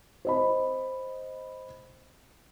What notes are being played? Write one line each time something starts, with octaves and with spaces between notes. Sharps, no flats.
C5 D#5 B5